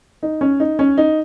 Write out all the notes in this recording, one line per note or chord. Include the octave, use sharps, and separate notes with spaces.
D#4
C#4
D#4
C#4
D#4